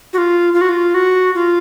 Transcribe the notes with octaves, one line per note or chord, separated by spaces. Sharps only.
F#4
F4
F4
F#4
F4
F#4
F4